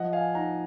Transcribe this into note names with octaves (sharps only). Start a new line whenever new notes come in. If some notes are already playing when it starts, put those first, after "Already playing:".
Already playing: F3 D#5 F#5
F5 G#5
D#4 F#5 A#5